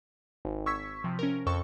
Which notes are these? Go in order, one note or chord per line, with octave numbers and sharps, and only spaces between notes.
G#1
C#6 E6 G#6 B6
C3 F3
C#4 A#4
F2 A4 C#6